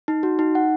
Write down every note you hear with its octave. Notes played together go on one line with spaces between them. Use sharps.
D#4
F#4
D#4
F#5